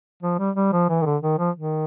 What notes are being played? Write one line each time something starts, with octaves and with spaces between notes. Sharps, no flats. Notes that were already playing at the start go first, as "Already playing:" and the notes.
F3
G3
G3
F3
E3
D#3
D3
D#3
F3
D#3